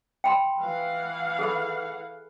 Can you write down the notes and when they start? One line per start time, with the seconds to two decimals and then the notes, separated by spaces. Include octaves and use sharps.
0.24 G5 B5 C6
0.61 E3 F5 F#5
1.39 G#4 A4 B5